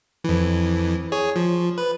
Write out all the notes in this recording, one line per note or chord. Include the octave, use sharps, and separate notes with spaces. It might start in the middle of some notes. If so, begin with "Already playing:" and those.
F2 E3
G#4 C#5
F3
B4